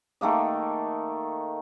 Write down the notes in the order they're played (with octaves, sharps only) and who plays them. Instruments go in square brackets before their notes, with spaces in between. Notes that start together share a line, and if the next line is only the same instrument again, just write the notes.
[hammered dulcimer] D#3 A3 A#3 D#5